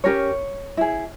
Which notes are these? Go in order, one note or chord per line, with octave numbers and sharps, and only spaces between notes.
C#4 G4 A#4 C#5
E4 G#4